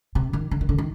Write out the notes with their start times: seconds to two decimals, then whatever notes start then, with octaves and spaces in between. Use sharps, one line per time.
0.15 C3
0.33 D#3
0.51 D3
0.61 D#3
0.69 D3
0.78 D#3